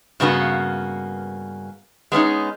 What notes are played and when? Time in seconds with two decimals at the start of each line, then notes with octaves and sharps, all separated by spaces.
0.20 G2 C#3 A#3 B3 F#4
2.12 G#3 B3 C#4 D#4